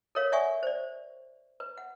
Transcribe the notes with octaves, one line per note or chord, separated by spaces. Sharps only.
A4 A#4 C#5 F5
D5 E5 F#5 G#5 C#6
C5 D5
B4
F#5